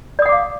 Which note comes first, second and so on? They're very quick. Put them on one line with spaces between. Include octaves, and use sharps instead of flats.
D5 D#6 F#5 D6 F5